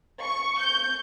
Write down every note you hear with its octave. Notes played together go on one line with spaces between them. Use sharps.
C#6
G6